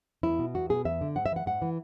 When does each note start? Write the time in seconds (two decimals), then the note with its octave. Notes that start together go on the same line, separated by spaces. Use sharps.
0.23 E2 E4
0.39 B2
0.54 E2 F#4
0.69 B2 G#4
0.85 E2 E5
1.01 D3
1.16 G#2 F#5
1.26 E5
1.32 E3 F#5
1.46 G#2 F#5
1.62 E3